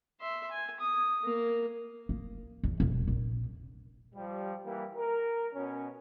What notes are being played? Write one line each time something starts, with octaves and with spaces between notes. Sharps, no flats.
E5 C6
G#5
D#6
A#3
A#3
E2
E1
A#1
F3 G3
E3 G3 A#3
A#4
B2 C#4